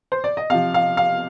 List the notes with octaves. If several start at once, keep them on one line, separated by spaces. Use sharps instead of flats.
C5
D5
D#5
C3 F3 F5
F5
F5